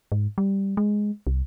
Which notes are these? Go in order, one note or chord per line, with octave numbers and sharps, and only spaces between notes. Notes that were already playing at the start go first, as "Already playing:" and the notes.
G#2
G3
G#3
C2